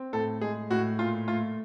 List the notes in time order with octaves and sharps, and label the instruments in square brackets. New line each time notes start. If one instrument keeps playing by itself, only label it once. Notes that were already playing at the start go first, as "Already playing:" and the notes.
Already playing: [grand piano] C4
A2 A4
G#3 G#4
A2 F#4
A#2 F4
A3 F4